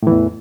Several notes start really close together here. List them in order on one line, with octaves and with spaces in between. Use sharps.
A2 E3 E2